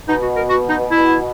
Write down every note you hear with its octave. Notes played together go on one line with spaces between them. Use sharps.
B2 D#4
F#4
A#4
F#4
D#4
E4